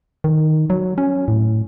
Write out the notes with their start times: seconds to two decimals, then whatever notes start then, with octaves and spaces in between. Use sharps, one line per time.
0.24 D#3
0.70 F#3
0.98 C#4
1.28 A2